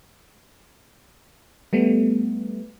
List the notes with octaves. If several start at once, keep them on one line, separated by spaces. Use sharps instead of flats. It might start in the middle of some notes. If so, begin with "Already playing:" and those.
G3 A3 B3